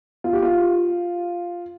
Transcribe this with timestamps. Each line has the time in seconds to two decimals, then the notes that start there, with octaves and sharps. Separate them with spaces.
0.24 F4
0.33 G4
0.42 F4